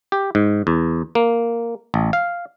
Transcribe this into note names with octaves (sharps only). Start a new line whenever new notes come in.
G4
G#2
E2
A#3
A1
F5